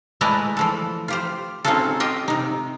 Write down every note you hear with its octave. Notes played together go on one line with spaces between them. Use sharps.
G#3 A3 E4 B4 D5 A#5
E3 F3 A4
F4 G4 C5
C4 C#4 D#4 F4 F#4 A4
F4 G4 D#5 G5
C3 D#4